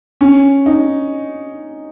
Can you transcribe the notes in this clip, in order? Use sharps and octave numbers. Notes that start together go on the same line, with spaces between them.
C#4
D#4